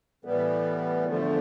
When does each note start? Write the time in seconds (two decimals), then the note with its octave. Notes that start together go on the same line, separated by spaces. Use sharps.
0.25 A2 E3 G3 B3
1.05 E2 D3 F3 A3